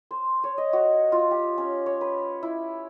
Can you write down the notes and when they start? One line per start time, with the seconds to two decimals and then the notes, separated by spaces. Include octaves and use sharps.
0.11 C5
0.44 C#5
0.58 D#5
0.73 F#4
1.12 F4
1.31 G4
1.58 C#4
1.86 C#5
2.01 B4
2.43 E4